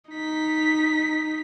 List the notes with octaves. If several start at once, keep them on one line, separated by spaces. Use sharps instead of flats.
D#4 B6